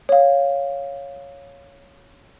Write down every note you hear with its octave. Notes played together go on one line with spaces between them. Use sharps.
C#5 F5